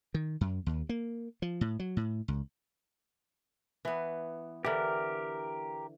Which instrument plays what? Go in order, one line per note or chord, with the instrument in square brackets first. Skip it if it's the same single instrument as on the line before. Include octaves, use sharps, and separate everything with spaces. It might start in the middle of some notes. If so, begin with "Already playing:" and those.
[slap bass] D#3
F#2
D#2
A#3
F3
A2
F#3
A2
C#2
[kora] E3 B3
[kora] D3 E3 [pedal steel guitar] G4 A#4